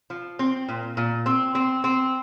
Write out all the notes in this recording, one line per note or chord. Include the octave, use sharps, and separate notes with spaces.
F3
C4
A#2
A#2
C4
C4
C4